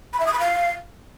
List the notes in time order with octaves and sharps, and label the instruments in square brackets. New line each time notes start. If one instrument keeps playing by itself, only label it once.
[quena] B5
E5
D#6
B5
F5